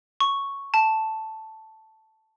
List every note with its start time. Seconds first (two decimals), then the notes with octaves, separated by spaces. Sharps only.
0.20 C#6
0.74 A5